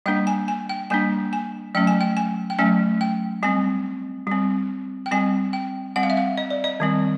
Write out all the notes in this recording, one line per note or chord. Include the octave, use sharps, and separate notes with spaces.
G3 A#3 D4 G5
G#5
G#5
G5
G3 A#3 D4 G#5
G#5
F#3 A3 C#4 G5
G#5
G5
G#5
G5
F#3 A3 C#4 G#5
G5
G3 C4 G#5
G3 C4
G5
G3 C4 G#5
G5
G3 C4 F#5
F5
E5
F5
D#5
D5
D#5
D#3 G3 C4